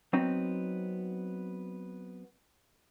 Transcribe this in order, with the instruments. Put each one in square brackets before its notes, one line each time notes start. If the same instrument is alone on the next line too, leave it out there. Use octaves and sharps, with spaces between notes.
[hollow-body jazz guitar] F#3 B3 C4 D#4